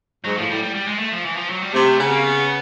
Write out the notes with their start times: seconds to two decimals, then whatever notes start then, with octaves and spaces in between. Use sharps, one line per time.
0.25 G#2 F#3
0.37 A2 F3
0.50 A2 G3
0.63 G3
0.75 G3
0.88 G#3
0.99 A3
1.12 F3
1.25 E3
1.37 F3
1.50 F#3
1.62 G3
1.74 C3 A3
1.86 A3
1.99 C#3 B3
2.11 A#3
2.24 B3